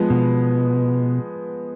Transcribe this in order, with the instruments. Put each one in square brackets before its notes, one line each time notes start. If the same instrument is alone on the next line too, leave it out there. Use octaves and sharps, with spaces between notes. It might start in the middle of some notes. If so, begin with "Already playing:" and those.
Already playing: [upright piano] F3 G#3 B3
[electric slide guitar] B2